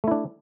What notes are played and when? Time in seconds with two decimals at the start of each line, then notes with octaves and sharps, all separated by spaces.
0.04 A3
0.08 E4
0.11 D4